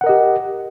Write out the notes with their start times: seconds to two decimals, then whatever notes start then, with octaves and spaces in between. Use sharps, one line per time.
0.01 F#5
0.04 A#4
0.06 D#5
0.09 G4